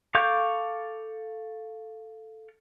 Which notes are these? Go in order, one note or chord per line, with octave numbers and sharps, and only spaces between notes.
A4 F5 C#6 D6 G6